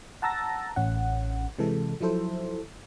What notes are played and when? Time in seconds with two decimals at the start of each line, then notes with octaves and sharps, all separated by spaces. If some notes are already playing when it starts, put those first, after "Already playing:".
0.22 F#5 A5 A#5 E6 A6 A#6
0.76 A1 C#4 F#5
1.59 C3 E3 G#3 A4
2.01 F3 F#3 E4 A4 C5